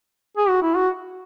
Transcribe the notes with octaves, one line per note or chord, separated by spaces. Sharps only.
G#4
F#4
E4
F#4